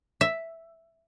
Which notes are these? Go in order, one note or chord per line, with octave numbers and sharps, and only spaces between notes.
E5